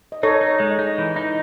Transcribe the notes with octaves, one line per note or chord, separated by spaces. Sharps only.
D#5
D#4 A4 C#5
D#4
G#3
D#4
E3
D#4